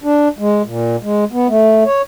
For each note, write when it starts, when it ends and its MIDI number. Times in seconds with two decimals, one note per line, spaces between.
0.04 0.29 62
0.39 0.62 56
0.65 0.96 46
1.02 1.24 56
1.32 1.48 59
1.48 1.84 57
1.85 2.02 73